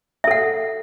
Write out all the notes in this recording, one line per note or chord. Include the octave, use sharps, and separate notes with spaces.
A4 E5 F#5